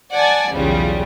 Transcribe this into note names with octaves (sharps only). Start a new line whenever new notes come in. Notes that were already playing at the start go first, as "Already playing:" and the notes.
D5 F#5 G#5 A5
B1 E2 C#3 G3 F4